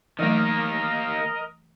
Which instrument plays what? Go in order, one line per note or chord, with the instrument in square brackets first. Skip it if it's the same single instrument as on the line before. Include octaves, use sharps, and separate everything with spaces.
[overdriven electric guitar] D#3 A#3 [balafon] E3 F#3 A3 [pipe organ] A#4 D#5